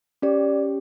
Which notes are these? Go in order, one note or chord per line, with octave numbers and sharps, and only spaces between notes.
C#4 G4 D5